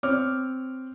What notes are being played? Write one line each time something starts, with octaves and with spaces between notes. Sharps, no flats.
C4 C#5 D6 F6